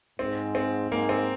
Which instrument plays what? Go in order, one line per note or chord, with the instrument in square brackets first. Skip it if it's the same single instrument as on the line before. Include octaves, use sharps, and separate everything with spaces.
[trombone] G#2 [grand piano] C4
[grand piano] C4
[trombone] G#2 [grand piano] A#3
[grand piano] C4